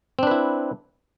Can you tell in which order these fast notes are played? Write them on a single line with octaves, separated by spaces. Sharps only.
C4 D4 B4 E4